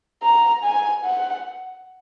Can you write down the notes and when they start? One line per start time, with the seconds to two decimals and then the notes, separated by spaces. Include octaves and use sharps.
0.23 A#5
0.64 G#5
1.05 F#5